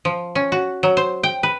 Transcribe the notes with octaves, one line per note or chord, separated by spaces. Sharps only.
F3
C#4
F#4
F#3
C5
G5
B4